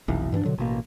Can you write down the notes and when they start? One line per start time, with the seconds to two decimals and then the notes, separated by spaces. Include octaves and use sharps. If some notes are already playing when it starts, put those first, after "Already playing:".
0.08 F1 B1 E3
0.32 G2 E3 C#4 D4
0.45 B2 D3 F#3
0.58 A1 B2 A#3